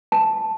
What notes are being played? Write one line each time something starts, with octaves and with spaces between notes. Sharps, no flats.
A5